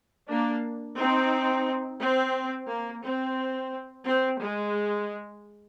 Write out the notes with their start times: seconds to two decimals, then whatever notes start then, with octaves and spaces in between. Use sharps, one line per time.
0.29 A#3 D4
0.99 C4 D#4
2.01 C4
2.69 A#3
3.03 C4
4.05 C4
4.41 G#3